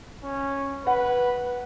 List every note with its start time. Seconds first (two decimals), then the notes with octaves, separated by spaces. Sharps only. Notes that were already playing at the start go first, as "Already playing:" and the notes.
0.24 C#4
0.86 B4 F#5